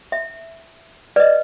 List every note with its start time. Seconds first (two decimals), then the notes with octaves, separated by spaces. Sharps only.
0.12 E5
1.16 B4 D5 D#5